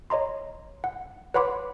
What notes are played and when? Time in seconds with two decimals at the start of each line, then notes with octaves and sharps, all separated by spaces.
0.10 C#5 D#5 A#5 C6
0.84 F#5
1.34 B4 C#5 F#5 B5 C6 D6